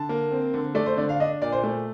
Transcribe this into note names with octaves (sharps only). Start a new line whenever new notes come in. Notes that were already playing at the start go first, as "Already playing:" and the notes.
Already playing: D3 A5
A#3
C4
D3
A3 D5
C5
D3 D5
F5
D4 D#5
A#2 D5
C5
A3